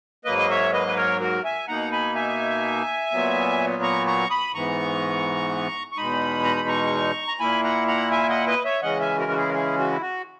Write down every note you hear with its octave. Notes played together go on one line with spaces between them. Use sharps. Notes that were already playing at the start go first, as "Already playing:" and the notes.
G#2 F#3 A#3 B4 D#5
D#5
C#5 E5
B4 D#5
B4
A#4 C#5
F#4 A#4
E5 G#5
B2 A#3 D#4 F#5 A#5
G#5 B5
E5 G#5
A#2 F#3 B3
A#5 C#6
A#5 C#6
B5 D#6
G#2 E3 B3 A#5 C#6
C#6
E2 B2 G#3 D#4 B5 D#6
A#5
B5
A#5 C#6
A#5
A#2 A#3 E4 G#5 B5
F#5 A#5
F#5 A#5
E5 G#5
D#5 F#5
B4 D#5
C#5 E5
C#3 E3 G#3 C#4 D#5 F#5
E5 G#5
F#4 A#4
F#4
E4 G#4
A#4
E4 G#4
F#4
E4
F#4